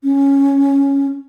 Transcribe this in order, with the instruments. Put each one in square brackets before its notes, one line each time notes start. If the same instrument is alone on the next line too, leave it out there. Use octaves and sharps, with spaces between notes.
[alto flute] C#4